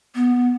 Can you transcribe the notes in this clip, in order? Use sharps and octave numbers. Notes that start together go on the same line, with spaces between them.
B3